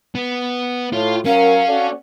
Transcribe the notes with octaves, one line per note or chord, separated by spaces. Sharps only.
B3
A2 F4
F#3 C#4 A#4 F5
F#4 A4 D5